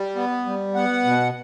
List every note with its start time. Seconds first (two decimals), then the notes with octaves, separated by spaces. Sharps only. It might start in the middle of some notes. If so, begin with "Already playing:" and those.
Already playing: G3
0.16 B3
0.46 G3
0.75 B3 F#5
1.05 B2